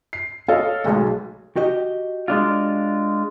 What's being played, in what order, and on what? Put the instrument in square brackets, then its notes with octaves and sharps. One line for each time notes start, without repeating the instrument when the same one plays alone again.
[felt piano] C7
A4 C#5 D#5 F5
B1 G#3 A3
[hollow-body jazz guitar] F#4 G4 D#5
[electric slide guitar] G#3 D4 F4